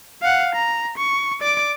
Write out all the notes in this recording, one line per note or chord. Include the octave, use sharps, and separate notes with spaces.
F5 F#5
A#5
C#6
D5 D6